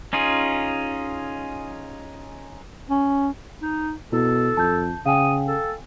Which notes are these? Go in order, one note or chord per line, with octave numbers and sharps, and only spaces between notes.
C#4 D#4 F4 G#4
C#4
D#4
B2 E4 A4
F2 A5 G6
C#3 F5 G5 G#5 D#6
A4